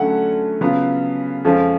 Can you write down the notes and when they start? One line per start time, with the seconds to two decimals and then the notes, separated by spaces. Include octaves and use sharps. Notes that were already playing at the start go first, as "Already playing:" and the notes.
Already playing: D3 F#3 A3 C#4 F#5
0.61 C#3 F#3 B3 F4
1.45 F2 F3 G#3 C#4 F4